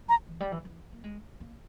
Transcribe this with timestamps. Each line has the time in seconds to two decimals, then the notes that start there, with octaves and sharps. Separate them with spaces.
0.08 E3 A#5
0.28 E3
0.40 G3
0.52 E3
0.65 E3
0.92 A#3
1.04 G#3
1.40 A#3